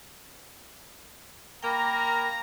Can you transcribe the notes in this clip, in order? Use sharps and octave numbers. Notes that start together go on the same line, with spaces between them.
A#3 A#4 G5 A#5 B5 D6